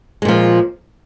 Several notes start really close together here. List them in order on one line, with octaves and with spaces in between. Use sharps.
G#3 A#2 F3